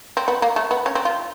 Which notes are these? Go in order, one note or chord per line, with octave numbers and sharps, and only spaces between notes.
C4
B3
A#3
A3
B3
C#4
C4
F4